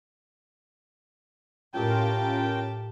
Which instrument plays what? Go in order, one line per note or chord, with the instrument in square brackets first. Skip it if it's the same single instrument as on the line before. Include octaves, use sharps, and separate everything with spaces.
[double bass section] A2 [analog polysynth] C#4 F4 A#4 [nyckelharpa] G4 A5 [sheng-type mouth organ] G5